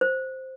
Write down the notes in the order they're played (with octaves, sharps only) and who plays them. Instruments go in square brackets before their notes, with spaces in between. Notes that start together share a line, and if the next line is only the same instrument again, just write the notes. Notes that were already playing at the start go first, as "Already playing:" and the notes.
[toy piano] C5